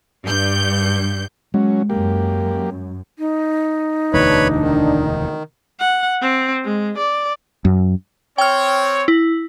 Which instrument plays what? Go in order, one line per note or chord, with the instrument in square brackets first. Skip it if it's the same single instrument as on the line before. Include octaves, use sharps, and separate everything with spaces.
[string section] G2 G6
[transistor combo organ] F#3 C#4 [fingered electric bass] G#3
[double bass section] F#2 [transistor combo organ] A#3 G4
[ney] D#4
[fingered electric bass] E1 D2 [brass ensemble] D4 [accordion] B4 C#5 B5
[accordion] D#3
[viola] F#5
C4
G#3
D5
[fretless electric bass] F#2
[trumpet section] C4 C#5 [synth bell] G5 F6
[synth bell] E4